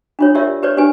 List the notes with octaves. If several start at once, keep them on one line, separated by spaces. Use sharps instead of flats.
D4 F4 C#5
F4 G4 A#4 C#5 D5 E5
G4 B4 C#5 D5
D4 G4 B4 G#5